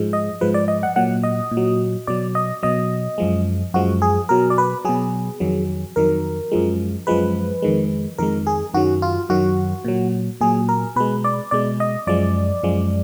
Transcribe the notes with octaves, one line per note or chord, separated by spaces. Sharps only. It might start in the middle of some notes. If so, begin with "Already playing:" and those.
Already playing: G#2 F3 G#3
D#5
G#2 F3 G#3 B4
D5
D#5
F#5
A#2 F#3 F#5
D#5
A#2
F#3
B2 F#3 D5
D#5
B2 F#3 D#5
F#2 F3 G#3
F#2 F3 G#3 F#4
G#4
B2 F#3 A#4
D5
B4
B2 F#3 G#4
F2 D#3 F#3
F2 D#3 F#3 A#4
F#2 F3 G#3
F#2 F3 G#3 B4
F2 D#3 G#3
F2 D#3 G#3 A#4
G#4
F#2 D#3 F#3 F#4
F4
F#2 D#3 F#3 F#4
A#2 F#3
A#2 F#3 G#4
A#4
B2 G#3 B4
D5
B2 G#3 D5
D#5
F#2 F3 G#3 D5
F#2 F3 G#3